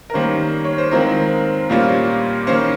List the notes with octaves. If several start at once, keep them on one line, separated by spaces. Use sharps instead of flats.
A#4
D#3 G3 A#3 C#4 C5
C#5
C5
D#3 G#3 C4 F4 A#4
A#2 G3 A#3 C#4 F4 C5
D#3 A#3 C#4 C5